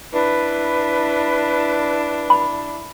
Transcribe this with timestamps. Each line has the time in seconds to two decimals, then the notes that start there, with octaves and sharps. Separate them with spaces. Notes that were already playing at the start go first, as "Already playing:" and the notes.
0.13 D4 E4 B4
2.30 B5